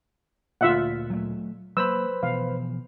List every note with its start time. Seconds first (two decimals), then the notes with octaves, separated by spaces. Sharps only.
0.61 D2 A#2 F4 E5 F#5
1.10 F#3 A3
1.77 F#3 A#3 B4 C5 B5 E6
2.23 B2 E3 F3 F5